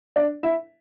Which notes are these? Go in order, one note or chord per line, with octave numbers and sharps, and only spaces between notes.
D4 D5
E4 E5